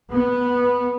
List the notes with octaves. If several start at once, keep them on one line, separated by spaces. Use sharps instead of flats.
B3